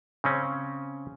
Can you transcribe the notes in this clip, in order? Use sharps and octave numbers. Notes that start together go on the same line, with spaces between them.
C#3 C4 C#4